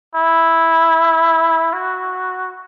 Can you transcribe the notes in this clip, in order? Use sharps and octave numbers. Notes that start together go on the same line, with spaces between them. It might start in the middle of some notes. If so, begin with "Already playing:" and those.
E4
F#4